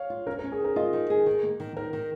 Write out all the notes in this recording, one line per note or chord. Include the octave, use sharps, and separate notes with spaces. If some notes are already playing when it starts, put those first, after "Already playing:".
Already playing: C#5 F5
F4
C#4 A#4
A#4
C#4
G#4
D#3 A#4
F4 D#5
D#3
G#4
D#3
A#3
D#3
D#3 A#4
D#3